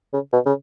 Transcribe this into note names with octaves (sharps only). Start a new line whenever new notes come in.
C#3
B2
C#3